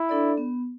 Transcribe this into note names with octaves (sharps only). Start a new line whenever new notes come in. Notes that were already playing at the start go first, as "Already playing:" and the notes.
Already playing: E4
D4 A4 D5
B3